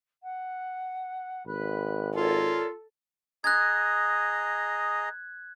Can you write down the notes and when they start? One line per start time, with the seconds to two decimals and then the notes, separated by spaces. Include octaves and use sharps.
0.22 F#5
1.46 G#1 B4 B5 F#6
2.16 F4 A4 A#4 C#5 D5
3.44 G#4 D#5 A#5 F#6 G#6